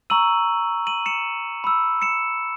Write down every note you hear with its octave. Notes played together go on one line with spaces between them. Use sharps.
A#5 C#6 E6 D#7 F#7
D#7 F#7
C#7 E7
B5 E6
C#7 E7